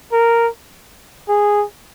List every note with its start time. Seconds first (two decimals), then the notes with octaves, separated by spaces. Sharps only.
0.13 A#4
1.29 G#4